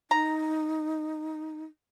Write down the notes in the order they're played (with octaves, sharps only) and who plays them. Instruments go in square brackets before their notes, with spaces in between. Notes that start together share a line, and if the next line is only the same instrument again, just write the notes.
[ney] D#4 [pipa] A#5